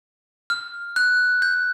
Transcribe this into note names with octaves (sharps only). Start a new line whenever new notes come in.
F6
F#6
G6